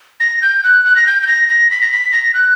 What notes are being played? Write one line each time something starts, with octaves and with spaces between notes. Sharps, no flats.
A#6
G6
F#6
F#6
A#6
G6
G6
A#6
A#6
B6
A#6
B6
A#6
F#6